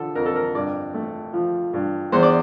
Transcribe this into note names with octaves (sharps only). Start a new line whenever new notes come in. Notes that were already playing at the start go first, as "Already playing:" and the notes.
Already playing: D3 F3 A4
F2 A#4
A4
A#4
G2 D5
A3
F3
G2
E2 C5
D5